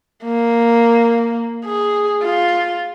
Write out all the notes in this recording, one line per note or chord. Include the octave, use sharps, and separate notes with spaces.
A#3
G#4
F4